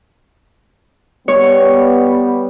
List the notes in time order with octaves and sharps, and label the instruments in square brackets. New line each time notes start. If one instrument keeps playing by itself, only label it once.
[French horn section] G3 B3 [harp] C#5